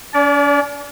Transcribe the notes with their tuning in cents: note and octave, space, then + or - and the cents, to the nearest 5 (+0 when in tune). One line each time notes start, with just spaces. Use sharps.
C#4 +45 D5 -25